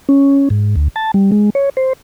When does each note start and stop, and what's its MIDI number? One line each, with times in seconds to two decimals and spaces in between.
0.09 0.49 61
0.50 0.75 44
0.76 0.88 38
0.96 1.11 81
1.14 1.31 55
1.32 1.50 56
1.55 1.69 73
1.77 1.93 72